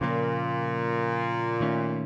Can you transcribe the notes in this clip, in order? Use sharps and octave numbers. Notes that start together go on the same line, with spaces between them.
A#2 C#3 F3 A#3
D#3 A3 C#4